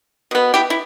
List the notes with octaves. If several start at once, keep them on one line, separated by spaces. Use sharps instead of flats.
B2 B3
E4 G4
E4